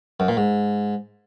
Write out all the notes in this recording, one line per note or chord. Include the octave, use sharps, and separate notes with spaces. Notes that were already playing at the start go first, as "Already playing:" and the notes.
F#2
A#2
G#2